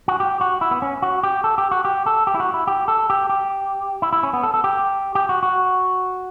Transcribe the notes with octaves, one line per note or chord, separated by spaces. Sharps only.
F#4
G4
F#4
E4
B3
C#4
F#4
G4
A4
G4
F#4
G4
A4
G4
E4
F#4
E4
G4
A4
G4
G4
E4
E4
C#4
B3
A4
A4
G4
G4
F#4
F#4